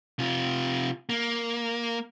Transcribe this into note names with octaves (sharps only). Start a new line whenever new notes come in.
C3 F4
A#3